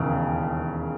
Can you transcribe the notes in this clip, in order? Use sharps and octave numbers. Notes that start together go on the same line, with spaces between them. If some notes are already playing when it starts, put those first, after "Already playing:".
Already playing: E1 D#2 C#3